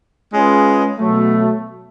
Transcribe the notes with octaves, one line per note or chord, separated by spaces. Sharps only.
G#3 C#4 F4 G#4 B4
B2 F#3 A3